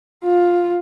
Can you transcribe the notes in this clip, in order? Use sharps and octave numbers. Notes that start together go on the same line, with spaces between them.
F4